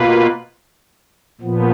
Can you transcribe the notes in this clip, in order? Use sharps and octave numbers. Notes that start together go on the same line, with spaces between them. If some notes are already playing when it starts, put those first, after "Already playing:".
Already playing: B2 A#3 F4 B4
A#2 F3 B3